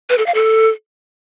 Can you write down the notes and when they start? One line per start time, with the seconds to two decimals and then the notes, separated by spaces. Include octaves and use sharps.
0.10 B4
0.18 A4
0.26 F5
0.34 A4